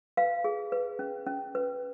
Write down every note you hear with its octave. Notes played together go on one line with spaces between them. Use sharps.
B4 F5
G#4
B4
C#4
C#4
B4